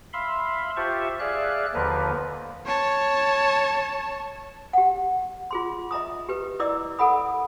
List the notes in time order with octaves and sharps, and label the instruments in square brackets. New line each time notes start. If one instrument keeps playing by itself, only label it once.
[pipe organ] E5 F5 B5 C6
F4 G4 C5 E5 A5 C#6
G#4 D5 E5 F5 F#6
D#2 D3 F3 A#4 B4
[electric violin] C#5 A5
[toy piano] G4 F#5
F4 G#4 C6
D#5 E5 A#5 D#6
G4 B4
E4 A#4 D5 D#5 D6 E6
A4 A#4 F#5 B5 D#6